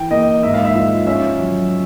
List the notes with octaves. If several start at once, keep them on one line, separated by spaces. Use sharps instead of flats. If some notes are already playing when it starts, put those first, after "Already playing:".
Already playing: E3 G5
A#3 D#5
G#2 E5
F5
E5
F3
C#4 E5
F#3